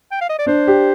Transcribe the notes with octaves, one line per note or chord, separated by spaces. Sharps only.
G5
F5
D#5
D5
D4 C5
G4